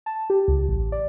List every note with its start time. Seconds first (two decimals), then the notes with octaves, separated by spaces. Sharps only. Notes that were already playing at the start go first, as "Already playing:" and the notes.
0.06 A5
0.30 G4
0.48 C#2
0.69 A1
0.92 D5